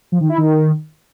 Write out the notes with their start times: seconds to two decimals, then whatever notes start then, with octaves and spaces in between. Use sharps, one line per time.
0.12 F3
0.21 D#3
0.29 E4
0.38 D#3